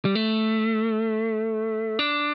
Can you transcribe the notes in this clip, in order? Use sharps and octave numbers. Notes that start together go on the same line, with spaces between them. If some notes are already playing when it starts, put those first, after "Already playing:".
G3
A3
D4